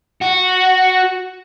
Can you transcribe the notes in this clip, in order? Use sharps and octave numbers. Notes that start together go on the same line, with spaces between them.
F#4